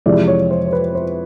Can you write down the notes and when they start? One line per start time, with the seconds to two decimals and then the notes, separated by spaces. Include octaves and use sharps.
0.06 F2 C3 E3 G#3 D5
0.27 C#5
0.51 C5
0.68 C5
0.73 B4
0.95 C5